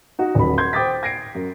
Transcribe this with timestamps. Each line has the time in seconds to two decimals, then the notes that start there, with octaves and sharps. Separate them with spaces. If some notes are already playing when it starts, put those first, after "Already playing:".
0.19 D#4 F#4
0.35 D#1 F#3 B5
0.58 C6 G6 G#6
0.73 C5 G5 D6 D#6 A6 B6
1.03 G#6 A#6 C7 D7
1.35 F#2